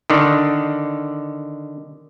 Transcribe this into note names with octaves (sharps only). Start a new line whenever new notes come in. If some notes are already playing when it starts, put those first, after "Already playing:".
D3 D#3